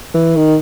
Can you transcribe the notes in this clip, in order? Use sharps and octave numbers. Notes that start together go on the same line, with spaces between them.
E3
D#3